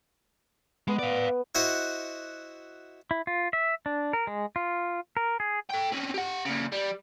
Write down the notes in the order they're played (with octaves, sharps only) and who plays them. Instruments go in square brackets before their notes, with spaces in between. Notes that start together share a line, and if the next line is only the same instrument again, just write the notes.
[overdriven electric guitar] G#3 [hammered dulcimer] B3
[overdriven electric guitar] D5 F5
[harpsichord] E4 F#4 C5 D#5 F#5
[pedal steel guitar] E4
F4
E5
D4
A#4
G#3
F4
A#4
G#4
[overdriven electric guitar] A4 G5
C4 C#4
G4 F#5
A#2 C#3
G3